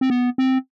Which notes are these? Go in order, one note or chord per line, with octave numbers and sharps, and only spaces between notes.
C4
B3
C4